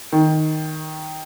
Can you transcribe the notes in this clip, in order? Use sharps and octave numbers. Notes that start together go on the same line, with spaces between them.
D#3